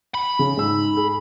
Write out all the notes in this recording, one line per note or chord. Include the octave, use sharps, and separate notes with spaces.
B5
C#3
G#2 E6
G#4